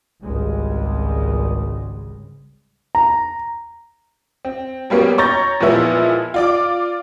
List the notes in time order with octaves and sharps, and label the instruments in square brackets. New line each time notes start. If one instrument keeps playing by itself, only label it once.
[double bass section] G#1 C#2 C#3 G3 G#3
[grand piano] A#5
[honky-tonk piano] C4
F#3 G3 A#3 B3 C#4
C#5 A#5 C#6 G6 A6 A#6
A#2 E3 F3 G#3 B3 E4
F4 D5 D6